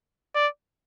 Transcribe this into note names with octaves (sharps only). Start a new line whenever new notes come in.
D5